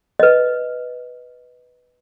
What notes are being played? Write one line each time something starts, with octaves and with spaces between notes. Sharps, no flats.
B4 D#5